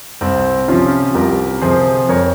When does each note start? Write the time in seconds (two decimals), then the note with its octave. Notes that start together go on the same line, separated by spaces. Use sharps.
0.21 C2 C4
0.68 C3 F3 C#4 F4
1.14 C2 G4 A#4
1.61 C3 F3 G#4 C5
2.09 F2 A#4 C#5